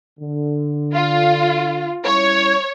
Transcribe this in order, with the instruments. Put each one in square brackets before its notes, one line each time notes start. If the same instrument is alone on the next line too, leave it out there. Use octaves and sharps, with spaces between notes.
[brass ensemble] D3
[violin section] F4
[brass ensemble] G3 C#4 E4 [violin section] C#5